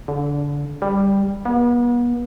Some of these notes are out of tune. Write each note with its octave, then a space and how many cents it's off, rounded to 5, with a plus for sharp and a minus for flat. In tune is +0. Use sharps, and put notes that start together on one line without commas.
D3 -25
G3 +10
B3 -40